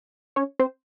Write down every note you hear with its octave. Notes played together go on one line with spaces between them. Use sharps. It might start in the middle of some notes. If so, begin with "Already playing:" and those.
C#4 C#5
C4 C5